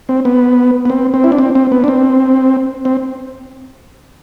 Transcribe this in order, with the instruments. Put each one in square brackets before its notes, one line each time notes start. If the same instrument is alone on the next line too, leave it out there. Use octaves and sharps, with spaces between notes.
[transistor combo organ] C4
B3
B3
C4
C4
E4
D4
C4
C4
B3
D4
C4
C4